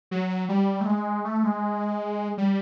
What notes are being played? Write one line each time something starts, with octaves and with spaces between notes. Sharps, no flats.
F#3
G3
A3
G#3
A3
G#3
G3